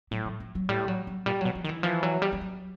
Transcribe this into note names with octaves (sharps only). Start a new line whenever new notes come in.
A2 F#3
F#3
F3
F#3
A2 G3
F#3
F#3
A#2 G3
B2 F#3
F3
D#3
E3
E3 F3
F#3
G3
G3
F#3